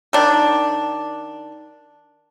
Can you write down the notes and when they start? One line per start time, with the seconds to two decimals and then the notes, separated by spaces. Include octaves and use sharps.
0.13 D#3 D4